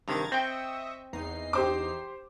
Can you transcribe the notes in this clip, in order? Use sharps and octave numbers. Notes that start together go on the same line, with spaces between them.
G2 C3 D#3 A#5 G#6 A6
C4 D#5 E5 G5 C#6
E2 D#4 C7
G4 C5 D6